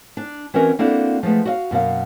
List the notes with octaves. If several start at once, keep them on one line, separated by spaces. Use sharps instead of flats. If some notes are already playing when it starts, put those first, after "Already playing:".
D4
E3 C4 C#4 F#4 A#4 D#5
A#3 C4 D4 E4 F#4 A4
F3 G#3 A3 B3
F#4 D#5 F5
F#2 B2 A#3 F5